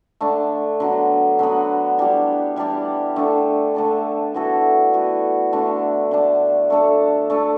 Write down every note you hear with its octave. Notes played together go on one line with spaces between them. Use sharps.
D3 A3 D4
D3 F#3 B3
D3 F#3 B3
E3 G3 D4 G4
E3 G3 D4 G4
D3 A3 D4 A4
D3 A3 D4 A4
E3 B3 F#4 A4
E3 B3 F#4 A4
D3 A3 D4
D3 A3 D4
A3 D4 A4
A3 D4 A4